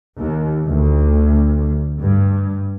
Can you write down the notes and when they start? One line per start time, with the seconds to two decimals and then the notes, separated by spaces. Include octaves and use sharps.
0.19 D#2
0.66 D2
2.00 G2